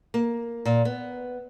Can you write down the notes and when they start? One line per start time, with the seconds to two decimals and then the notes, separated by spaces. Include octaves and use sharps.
0.14 A#3
0.65 A#2
0.85 B3